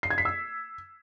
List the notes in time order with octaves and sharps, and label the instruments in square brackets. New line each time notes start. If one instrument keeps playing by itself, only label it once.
[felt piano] C7
G#6
B6
E6